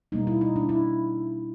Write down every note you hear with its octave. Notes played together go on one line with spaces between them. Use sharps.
B2 G3 A#3 D#4
E4
D#4
D4
E4